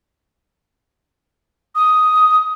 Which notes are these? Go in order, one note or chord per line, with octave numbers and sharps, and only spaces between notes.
D#6